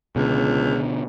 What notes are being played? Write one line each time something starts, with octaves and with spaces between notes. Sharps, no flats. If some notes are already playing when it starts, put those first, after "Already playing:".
C#2 B2 D3